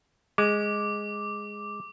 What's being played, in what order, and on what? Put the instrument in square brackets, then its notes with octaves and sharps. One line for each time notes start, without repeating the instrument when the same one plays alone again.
[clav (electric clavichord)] G#3 [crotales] D6